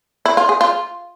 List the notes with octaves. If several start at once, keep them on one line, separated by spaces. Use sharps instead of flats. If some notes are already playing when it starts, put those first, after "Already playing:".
E4
F4
G#4
F4